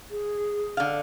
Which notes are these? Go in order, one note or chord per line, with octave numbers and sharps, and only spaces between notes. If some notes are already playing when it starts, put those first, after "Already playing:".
G#4
D3 F5